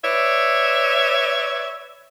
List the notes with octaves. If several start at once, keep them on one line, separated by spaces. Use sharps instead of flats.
B4 C#5 D5 E5